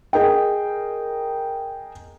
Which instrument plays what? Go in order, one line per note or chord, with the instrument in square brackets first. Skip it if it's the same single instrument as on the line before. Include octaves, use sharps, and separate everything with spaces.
[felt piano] G#4 A#4 D#5 G5